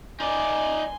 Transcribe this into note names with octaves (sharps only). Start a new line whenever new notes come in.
D#4 D5 G#5 C6